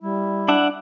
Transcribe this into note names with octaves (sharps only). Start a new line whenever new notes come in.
G3 E4
D4 D5 E5 F#5